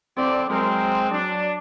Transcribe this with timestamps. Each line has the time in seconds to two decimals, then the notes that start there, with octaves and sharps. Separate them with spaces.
0.17 F2 D3 C4 D5
0.50 F#3 G#3 C4 A#4
1.11 F#3 D4